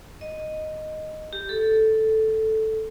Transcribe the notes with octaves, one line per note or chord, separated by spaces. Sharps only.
D#5
G4
A4